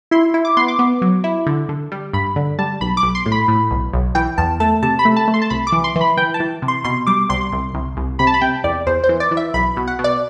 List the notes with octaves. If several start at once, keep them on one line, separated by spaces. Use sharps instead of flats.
E4 C6
E4
D6
B3 C6
D6
B3
F#3
E4
D3
D3
G3
G2 B5
D3
G3 A5
B1 B5
D6
B1
C6
A2
B5
A2
B1
B1
E3 G5
E2 A5
A3 A5
C3 A5
B5
A3
A5
A3
C6
A5
C2 B5
D6
E3
C6
E3
B5
E3 G5
A5
E3
C3
C6
B2 C6
G3 D6
C2 C6
C2
C2
C2
C3 B5
A5
B5
C3 G5
E2 D5
E2 C5
C5
E3
D5
E3
E5
B1 B5
B2
F#5
B2
D5